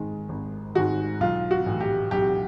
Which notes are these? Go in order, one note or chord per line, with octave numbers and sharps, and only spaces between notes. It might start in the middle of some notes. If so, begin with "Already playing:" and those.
Already playing: G#2 D#3 G#3
G#1
G#2 D#3 G#3 F#4
B1 F4
F#4
A2 E3
G4
B1 G4